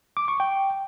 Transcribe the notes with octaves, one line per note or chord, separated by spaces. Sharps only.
D6
C#6
G5